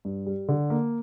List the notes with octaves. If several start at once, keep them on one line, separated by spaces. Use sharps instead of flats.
G2
G3
D3
A#3